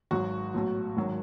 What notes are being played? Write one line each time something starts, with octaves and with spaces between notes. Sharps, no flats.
G#1 G#2 F#3 F#4
B1 A2 F#3
G#1 G#2 D#3 F#3